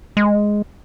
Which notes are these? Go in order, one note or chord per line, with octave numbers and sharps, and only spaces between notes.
G#3